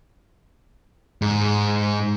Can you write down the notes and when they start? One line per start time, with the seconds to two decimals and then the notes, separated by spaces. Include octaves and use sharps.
1.22 G#2